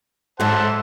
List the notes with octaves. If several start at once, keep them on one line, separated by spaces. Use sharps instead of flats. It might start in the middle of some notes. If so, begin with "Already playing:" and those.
G#2 F#3 A4 C5 E5 F#5 A5